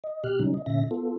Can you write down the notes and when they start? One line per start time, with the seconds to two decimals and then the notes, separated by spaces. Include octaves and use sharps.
0.04 D#5
0.24 B2 G4 F6 F#6
0.40 C#3 F#3 G3 C#4 D#4
0.54 D#5
0.66 A#2 D3 C#4 E5 A#6
0.91 B3 F4 A4